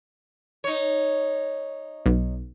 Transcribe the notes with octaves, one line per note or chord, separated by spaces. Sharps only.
D#4 C#5
B1